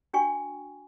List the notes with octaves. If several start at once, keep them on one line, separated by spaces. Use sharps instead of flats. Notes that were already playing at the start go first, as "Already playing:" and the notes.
D4 F#4 G5 G#5 C#6